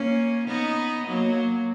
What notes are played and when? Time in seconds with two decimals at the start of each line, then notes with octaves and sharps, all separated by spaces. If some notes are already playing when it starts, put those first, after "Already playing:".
Already playing: A#3 C#4
0.47 B3 D#4
1.07 F#3 A#3